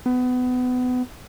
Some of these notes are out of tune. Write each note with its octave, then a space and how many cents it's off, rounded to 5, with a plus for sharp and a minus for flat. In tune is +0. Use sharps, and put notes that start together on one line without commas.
B3 +25